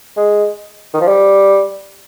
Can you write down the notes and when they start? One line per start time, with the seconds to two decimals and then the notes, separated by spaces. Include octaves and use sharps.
0.17 G#3
0.94 D#3
1.01 F3
1.08 G3